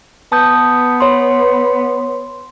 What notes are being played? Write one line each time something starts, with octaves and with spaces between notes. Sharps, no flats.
B3 A5 D#6 G6
C#5 B5 C6